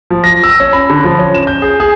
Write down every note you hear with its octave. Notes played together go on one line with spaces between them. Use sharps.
F3
A#6
E6
C#4
B5
D3
F3
C#4
E7
G6
G#4
G#4